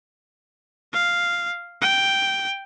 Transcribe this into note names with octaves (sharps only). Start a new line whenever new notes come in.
F5
G5